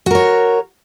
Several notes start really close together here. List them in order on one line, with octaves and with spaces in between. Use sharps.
F#4 A#4 C#5